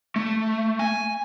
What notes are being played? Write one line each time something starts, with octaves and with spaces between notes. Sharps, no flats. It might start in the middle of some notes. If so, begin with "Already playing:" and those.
A3
G#5